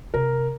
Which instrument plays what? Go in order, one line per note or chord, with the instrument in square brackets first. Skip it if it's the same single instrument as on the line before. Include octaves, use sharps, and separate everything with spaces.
[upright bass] C3 [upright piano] A#4